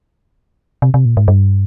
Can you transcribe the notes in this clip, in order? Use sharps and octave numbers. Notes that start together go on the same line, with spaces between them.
C3
C3
A#2
G#2
G2